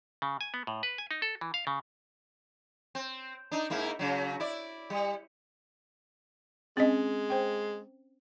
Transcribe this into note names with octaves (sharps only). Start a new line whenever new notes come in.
C#3
G#5
B3
A2
B4
G#5
D#4
A4
E3
F5
C#3
C4
D4 D#4
G#2 A#3 E4
C#3 F#3
E4 D5
G3
G#3 C4 C#4 D#5
C5 G5